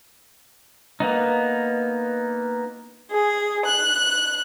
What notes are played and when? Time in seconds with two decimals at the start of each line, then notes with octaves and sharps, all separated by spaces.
1.00 A#3 B3 D#4
3.10 G#4
3.65 F#6